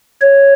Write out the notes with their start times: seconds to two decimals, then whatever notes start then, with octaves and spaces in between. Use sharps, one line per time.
0.22 C#5